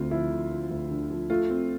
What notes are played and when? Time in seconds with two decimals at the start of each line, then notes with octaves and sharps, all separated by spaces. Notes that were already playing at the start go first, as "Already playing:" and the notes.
Already playing: D2 C4 F4
0.11 F3 E4
0.31 D3
0.51 F3
0.70 D2
0.91 D3
1.10 F3
1.30 A3 F4
1.50 C4